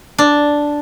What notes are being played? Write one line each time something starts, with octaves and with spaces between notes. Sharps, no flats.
D4